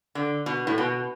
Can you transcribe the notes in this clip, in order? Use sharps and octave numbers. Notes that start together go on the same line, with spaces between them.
D3
B2
A2
B2